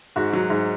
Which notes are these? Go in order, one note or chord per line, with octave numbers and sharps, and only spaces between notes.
G#2 F#4
F#3
G#2